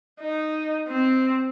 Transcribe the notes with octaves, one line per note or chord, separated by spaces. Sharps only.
D#4
C4